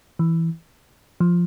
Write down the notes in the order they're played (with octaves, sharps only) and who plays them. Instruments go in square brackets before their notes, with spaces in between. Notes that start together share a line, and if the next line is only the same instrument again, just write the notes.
[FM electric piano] E3
F3